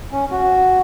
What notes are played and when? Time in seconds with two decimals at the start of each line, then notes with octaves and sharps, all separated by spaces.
0.12 C#4
0.31 F#4